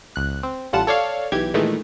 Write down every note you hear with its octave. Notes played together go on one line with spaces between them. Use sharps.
C#2 F#6
C4
A1 G3 F4 F#5 A5 E7
A4 C#5 D5 F5
B1 E3 G4 G#6
A#2 D#3 E3 G#3 A3